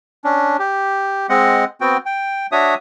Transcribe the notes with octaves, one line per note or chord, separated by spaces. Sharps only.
C#4 D4
G4
G#3 C4 D#5 F#5
B3 C4 F#4 G5
G5
D4 F#4 C#5 E5 D#6